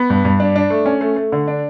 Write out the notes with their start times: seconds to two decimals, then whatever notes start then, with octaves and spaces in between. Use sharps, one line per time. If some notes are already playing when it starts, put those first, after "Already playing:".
Already playing: B3
0.10 G2
0.25 G2
0.40 D4
0.56 D4
0.70 A3
0.86 C#4
1.01 A3
1.16 A3
1.32 D3
1.48 D4